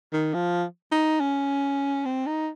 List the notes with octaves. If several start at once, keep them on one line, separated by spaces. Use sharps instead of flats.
D#3
F3
D#4
C#4
C4
D#4